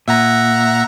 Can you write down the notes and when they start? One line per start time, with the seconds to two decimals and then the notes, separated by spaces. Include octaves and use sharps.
0.08 A#2 E5 F#5 A#5